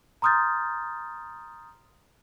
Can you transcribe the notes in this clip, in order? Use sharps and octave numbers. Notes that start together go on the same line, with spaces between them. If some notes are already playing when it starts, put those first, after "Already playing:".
A#5 C6 D#6 F6 G6 A6